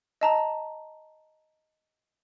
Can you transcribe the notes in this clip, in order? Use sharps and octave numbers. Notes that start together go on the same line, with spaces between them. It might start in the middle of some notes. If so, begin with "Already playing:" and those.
D#5 A5 A#5